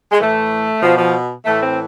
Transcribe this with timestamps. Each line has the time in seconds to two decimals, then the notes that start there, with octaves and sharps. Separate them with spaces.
0.12 G#3
0.19 A2 E3 A3
0.82 B2 F3
0.97 F3
1.44 A2 E3 A3
1.59 C4